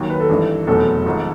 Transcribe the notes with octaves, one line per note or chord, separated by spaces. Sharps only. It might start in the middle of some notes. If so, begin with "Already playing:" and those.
Already playing: D#2 D#3 F#3
B4
A4
G#1 G2 E3
F1 E2 B2 F#3 A4
G#1 G#2 F3